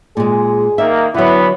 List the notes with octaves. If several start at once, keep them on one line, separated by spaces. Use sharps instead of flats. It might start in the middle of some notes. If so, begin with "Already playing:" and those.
A#2 G#3 G#4
D#3 A#3 E5
D3 E3 F#3 B3 E4